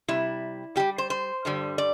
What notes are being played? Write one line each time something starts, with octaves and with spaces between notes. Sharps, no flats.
C3 G3 E4
A2 G3 G4
C5
C5
G2 D3 G3
D5